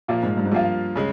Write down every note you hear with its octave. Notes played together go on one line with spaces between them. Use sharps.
A#2 F3 A#3 F4
G#2
G2
G#2
G2 F3 A#3 F4
C#3 G#3